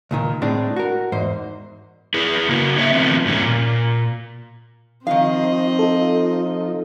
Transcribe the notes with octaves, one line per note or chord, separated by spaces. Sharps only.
C#2 A#2 D#3
A2 G#3 C4 D4
F#4 A#4
E2 G#2 C5
E4 G#4 B4
C#3 A#3 F#4
D3 C#5 E5
D#3 F3 A3 B3 C4
G2 A#2 C#4
A#2
D#3 F3 C4 D#4 D#5 F5
F4 A4